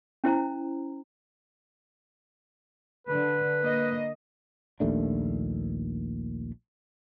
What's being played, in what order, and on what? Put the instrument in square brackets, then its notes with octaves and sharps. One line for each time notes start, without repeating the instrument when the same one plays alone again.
[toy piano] C#4 E4 C5 A#5
[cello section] D3 [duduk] B4
[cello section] A#3 D#5
[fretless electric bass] A#1 D#2 A3 D4